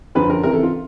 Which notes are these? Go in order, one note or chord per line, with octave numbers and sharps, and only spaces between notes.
F#2 D3 F3 B4
A#4
C#2 C3 E3 A#4
A4
F4